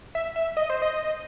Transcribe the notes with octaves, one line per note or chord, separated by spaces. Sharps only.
E5
E5
D#5
C5
D#5